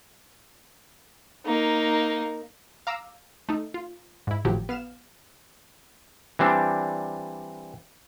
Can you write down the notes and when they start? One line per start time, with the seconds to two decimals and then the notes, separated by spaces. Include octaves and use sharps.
1.46 A#3 D#4
2.87 F5 A#5 D6 E6
3.49 A3 D#4
3.74 F4
4.27 G#2 E4
4.45 G#1 A2 F3 F#3 G4
4.69 B3 F5 F6 E7
6.39 E3 G3 C4 D4